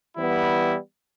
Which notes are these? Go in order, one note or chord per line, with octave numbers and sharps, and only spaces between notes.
E3 G3 B3 E4